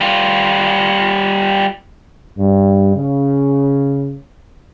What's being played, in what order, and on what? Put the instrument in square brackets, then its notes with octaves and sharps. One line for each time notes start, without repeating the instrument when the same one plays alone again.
[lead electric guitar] G3 F4
[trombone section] G2
C#3